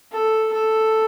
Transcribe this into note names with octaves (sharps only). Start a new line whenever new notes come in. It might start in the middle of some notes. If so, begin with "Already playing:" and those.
A4
A4